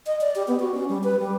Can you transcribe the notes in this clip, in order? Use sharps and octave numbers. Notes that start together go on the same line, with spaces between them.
D#5
D5
G4
B3
F#4
C#4
G3
B4
G3